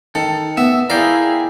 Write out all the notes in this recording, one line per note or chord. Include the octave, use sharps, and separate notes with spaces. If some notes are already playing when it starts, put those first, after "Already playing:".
D#3 A4
B3 E5
E4 G#4 A#4 D5 F5 G5